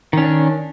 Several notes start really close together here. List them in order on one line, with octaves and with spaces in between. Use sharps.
D#3 C#4 D4